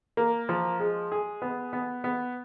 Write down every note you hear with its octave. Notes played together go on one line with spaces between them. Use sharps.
A#3
F3
G#3
G#4
B3
B3
B3